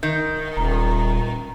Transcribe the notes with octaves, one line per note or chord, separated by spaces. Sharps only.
D#3 G6
D#1 A#5